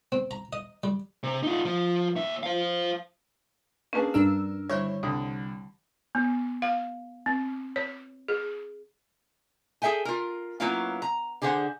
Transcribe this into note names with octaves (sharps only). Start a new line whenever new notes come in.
C4
A#5
D#5
G3
C3
D#4 F4
F3
D#2 E5
C5 F5
A#3 C#4 D4 G#4 B4 A5
G2 D4 A#4 E6
D3 D#3 G3 E4 C5 C#5
C2 D3 D#6
B3
F5
C4
C#5
G#4
G#4 A4 E5 G5 G#5
F4 A#4
F#3 A#3 B3 C#4 E4 F4
A#5
D3 G4 G#4 C5 F#5